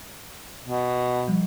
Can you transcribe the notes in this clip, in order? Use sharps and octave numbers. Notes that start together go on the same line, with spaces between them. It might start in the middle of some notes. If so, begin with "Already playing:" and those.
B2
F3 G3